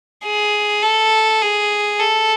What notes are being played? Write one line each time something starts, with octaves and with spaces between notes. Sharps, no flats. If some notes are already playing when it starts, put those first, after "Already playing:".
G#4
A4
G#4
A4